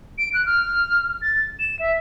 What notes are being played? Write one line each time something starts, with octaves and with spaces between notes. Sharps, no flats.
D7
F#6
F6
A6
E7
E5